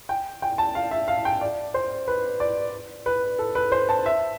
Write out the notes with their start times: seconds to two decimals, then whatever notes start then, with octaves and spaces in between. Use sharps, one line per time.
0.09 G5
0.42 G5
0.58 A5
0.75 F5
0.91 E5
1.08 F5
1.25 G5
1.41 D5
1.74 C5
2.08 B4
2.40 D5
3.06 B4
3.39 A4
3.55 B4
3.72 C5
3.89 A5
4.06 E5